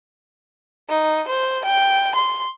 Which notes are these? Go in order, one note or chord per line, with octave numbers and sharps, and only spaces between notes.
D#4
C5
G5
C6